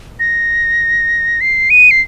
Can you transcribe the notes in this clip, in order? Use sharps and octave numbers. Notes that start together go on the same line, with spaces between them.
A#6
C7
D#7
C7